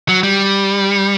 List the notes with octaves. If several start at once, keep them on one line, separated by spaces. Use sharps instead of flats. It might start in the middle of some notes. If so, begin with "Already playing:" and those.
F#3
G3